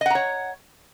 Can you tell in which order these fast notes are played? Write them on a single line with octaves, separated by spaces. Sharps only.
D#5 F#5 A#5 C#5